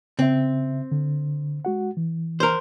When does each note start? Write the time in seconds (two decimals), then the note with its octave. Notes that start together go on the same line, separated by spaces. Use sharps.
0.19 C#3 C4 E5
0.92 D3
1.65 G#3 F#4 F#5
1.97 E3
2.40 A#4 C5